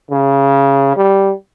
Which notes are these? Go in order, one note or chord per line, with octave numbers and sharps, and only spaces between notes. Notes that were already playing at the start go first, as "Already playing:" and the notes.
C#3
G3